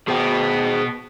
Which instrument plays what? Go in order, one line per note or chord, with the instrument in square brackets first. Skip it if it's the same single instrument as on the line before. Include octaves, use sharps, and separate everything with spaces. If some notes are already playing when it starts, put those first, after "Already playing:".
[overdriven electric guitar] B2 B3 [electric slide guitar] G#4 C5 G5